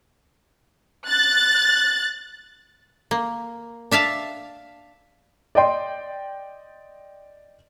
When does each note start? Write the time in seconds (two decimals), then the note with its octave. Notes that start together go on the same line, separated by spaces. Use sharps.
1.09 F#6 A6
3.11 A#3
3.91 D4 E5 F5 A5
5.55 D5 D#5 G5 C6